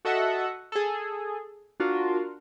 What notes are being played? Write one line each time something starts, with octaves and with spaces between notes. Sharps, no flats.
F#4 A4 D#5 E5 F#5
G#4 A4
D4 F4 F#4 A#4